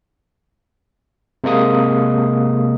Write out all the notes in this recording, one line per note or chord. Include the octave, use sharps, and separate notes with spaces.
C3 G#3 A#3 D#6